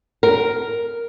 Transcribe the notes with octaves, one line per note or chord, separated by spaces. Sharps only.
A#4